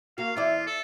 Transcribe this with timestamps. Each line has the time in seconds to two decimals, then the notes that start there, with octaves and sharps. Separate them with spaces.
0.18 A#3 F#4 F5
0.36 E2 E4 F4 D5
0.66 A4